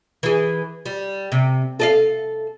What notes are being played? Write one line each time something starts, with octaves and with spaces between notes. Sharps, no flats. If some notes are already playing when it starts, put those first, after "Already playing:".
E3 G#4
G3
C3
A4 D#5 F5